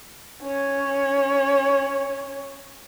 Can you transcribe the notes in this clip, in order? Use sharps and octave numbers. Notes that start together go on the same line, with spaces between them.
C#4 C#5